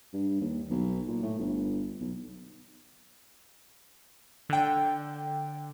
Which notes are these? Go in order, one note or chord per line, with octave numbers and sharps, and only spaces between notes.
G2
D#2
B1
A#2
A2
G1
B1
D3 G5